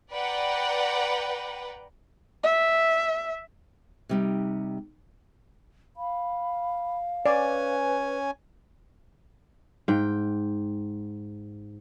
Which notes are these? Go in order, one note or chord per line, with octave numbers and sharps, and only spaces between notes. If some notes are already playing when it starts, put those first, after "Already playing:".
B4 D5 F#5 G5 A#5
E5
C3 G3 D#4
F5 B5
C#4 B4 D5 G#5
G#2 G5